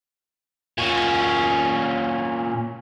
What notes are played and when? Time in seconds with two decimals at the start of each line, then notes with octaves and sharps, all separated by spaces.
0.78 A#2 C#4